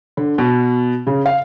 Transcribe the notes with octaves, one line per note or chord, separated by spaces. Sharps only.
D3
B2
C#3
F5